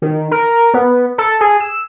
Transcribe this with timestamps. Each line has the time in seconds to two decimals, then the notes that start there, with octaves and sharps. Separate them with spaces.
0.02 D#3
0.31 A#4
0.74 B3
1.18 A4
1.41 G#4
1.60 E6